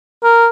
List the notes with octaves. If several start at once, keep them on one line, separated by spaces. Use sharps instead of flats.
A#4